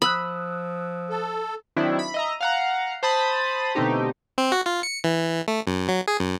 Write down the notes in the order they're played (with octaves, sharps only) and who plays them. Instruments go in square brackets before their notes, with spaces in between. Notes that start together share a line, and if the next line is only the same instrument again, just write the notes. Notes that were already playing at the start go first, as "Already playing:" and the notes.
[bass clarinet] F3 [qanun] B5 [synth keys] D#6 E6 F#6
[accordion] A4
[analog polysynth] D#3 F#3 C4 D4 E4
B5
D#5 E5 A#5
F5 F#5 A#5
C5 A5 B5 D#6 A6
B2 D3 A3 C4 D#4 G4
[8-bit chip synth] C4
F#4
F4
C#7
E3
A3
F#2
F#3
G#4
F#2